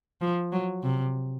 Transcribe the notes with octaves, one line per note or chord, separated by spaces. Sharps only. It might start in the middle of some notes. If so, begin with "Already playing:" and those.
F3
F#3
C3